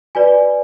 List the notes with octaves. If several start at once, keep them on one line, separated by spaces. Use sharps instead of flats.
F#4 B4 D5 G#5